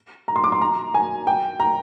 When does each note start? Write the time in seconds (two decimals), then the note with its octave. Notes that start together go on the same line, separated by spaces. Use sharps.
0.28 A#5
0.36 C6
0.44 D6
0.52 C6
0.61 A#5
0.94 G#5
1.27 G5
1.60 A#5